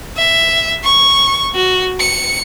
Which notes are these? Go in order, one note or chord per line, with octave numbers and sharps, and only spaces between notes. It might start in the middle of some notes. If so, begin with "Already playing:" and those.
E5
C#6
F#4
C#7